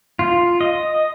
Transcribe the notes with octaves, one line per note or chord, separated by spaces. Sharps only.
F4
D#5